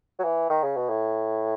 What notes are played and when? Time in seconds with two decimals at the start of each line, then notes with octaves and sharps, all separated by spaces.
0.19 F#3
0.24 E3
0.49 D#3
0.63 C#3
0.76 B2
0.89 A2